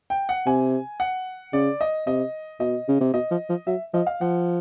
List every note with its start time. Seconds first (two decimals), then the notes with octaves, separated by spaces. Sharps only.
0.10 G5
0.29 F#5
0.46 C3 G#5
1.00 F#5
1.53 C#3 D5
1.81 D#5
2.07 C3 D#5
2.60 B2 D#5
2.88 C#3
3.01 C3
3.14 B2 D#5
3.31 F3
3.50 F3
3.67 F#3 E5
3.94 F3 D#5
4.07 F5
4.21 F3 F#5